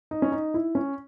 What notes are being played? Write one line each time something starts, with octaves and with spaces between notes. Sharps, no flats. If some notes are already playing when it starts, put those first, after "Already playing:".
D#4
C#4
D#4
E4
C#4